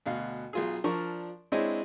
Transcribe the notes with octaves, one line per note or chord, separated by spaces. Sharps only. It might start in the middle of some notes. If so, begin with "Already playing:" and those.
D2 B2 F5
B1 F4 G#4
F3 D4 A#4 D5 C#6
G#3 C4 D4 E4 C#5 D#5